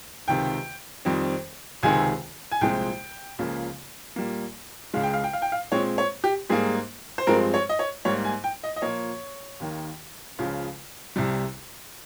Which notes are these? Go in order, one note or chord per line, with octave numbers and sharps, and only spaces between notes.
C#2 C3 D#3 G5
F2 D#3 G3 C4
C#2 C3 D#3 G#3 C4 G#5
G#5
C2 A#2 F3 G#3 C4 G5
C#2 C#3 F3 A#3
A#2 G3 A#3
C#2 C#3 G#3 F5
G5
F5
G5
F5
G5
F5
A#2 G#3 C4 C#5
C#5
G4
G#2 G3 A#3 G#4
C5
G2 F3 G#3 C4 A#4
C#5
D#5
C#5
G#2 G3 A#3 C#5
G#5
G5
D#5
D#5
A#2 F3 A#3 C#5
D#2 D#3 A#3
C#2 C#3 F3
C2 C3 G3